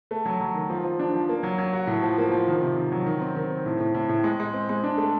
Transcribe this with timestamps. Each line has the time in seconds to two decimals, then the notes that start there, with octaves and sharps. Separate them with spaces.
0.11 A3
0.25 F#3
0.40 F#3
0.54 D#3
0.70 F3
0.84 F3
0.99 D4
1.14 F3
1.29 A#3
1.43 F#3
1.58 F#3
1.73 F#4
1.87 A2
2.03 F3
2.18 A#3
2.32 F3
2.48 D#3
2.61 C3
2.76 D#3
2.92 F#3
3.06 D#3
3.21 C4
3.36 D#3
3.50 C4
3.66 A2
3.80 A2
3.94 A2
4.09 A2
4.24 G#3
4.40 G#3
4.53 C4
4.69 G#3
4.84 D4
4.98 A3